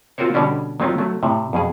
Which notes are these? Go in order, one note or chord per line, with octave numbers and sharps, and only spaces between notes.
C4 F4 F#4 A#4 C5 C#5
B2 D3 G3 C#4 D4
D#3 F#3 C4 C#4 F4
F#3 A3
A2 C3
F2 B2 G#4